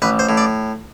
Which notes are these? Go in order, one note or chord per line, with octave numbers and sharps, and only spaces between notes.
A1 B4
C5
A2
D5